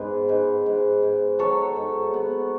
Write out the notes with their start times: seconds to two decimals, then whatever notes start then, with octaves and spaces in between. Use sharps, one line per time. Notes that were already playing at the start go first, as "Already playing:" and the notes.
Already playing: G#2 B3 B4
0.29 G#2
0.66 G#2
1.03 G#2
1.39 F#3 A4 C#5
1.76 G#2
2.14 B3